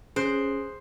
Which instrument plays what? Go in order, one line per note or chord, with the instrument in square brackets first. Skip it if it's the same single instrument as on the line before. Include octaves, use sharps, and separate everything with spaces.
[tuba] C#4 [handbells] G#4 F#6 [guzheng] C5